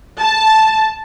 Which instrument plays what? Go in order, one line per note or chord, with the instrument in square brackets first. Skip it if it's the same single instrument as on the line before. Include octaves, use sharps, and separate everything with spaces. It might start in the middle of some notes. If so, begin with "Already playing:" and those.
[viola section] A5